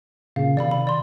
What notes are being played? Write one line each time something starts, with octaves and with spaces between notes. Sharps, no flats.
A#2 C#3 A#3 F5
C3 D#3 D5 F5 B5
B5
D5 C6